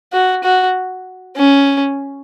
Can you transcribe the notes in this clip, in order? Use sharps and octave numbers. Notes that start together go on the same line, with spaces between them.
F#4
F#4
C#4